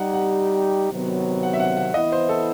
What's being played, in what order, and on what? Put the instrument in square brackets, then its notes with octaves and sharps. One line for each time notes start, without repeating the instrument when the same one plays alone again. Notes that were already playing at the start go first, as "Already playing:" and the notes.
Already playing: [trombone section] G3 D#4 G4 [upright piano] F#5
[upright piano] F#5
[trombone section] C3 D#3 F#3 B3
[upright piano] F#5
E5
F#5
F#5
[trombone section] E3 B3 E4 [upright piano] D#5
[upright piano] C5
A4